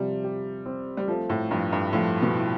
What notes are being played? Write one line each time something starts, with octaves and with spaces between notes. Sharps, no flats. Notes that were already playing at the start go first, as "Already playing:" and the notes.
Already playing: C3 F3 G3
G4
C4
G3
F3 A3
A2
G2 F3
G2
A2 F3
B2
E4